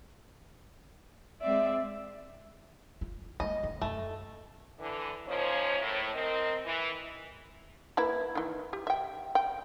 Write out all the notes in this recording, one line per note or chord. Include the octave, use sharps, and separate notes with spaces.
G#3 C4 D5 E5
F4
G#3 A#3 D#5
D3
F#2 A3
D3 E3
D#3 F3 A#3 C#4 C5 C#5
A2
C4 A#4 D#5
E3
A#3 E4 B4
D#3 E3
G4
E5 G5
G5